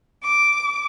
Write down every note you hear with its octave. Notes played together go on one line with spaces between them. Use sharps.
D6